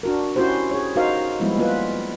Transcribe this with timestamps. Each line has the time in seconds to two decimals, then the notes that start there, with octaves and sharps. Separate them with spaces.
0.03 D4 F#4 A#4
0.36 C#4 E4 F#4 G4 C5
0.71 G#4 C#5
0.96 D#4 F#4 A#4 C5 F5
1.40 F3 G3 G#3 B3 E4
1.57 A#3 B3 F4 B4